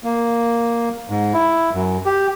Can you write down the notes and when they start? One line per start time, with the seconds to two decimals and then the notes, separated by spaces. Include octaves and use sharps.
0.04 A#3
1.10 G#2
1.33 E4
1.74 F#2
2.06 G4